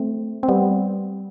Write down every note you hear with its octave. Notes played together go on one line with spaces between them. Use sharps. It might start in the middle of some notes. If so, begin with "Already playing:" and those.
Already playing: A3 C4
C4
G3 B3